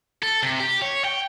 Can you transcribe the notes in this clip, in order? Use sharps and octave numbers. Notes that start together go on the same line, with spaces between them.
A4
C3
G4
C#5
G5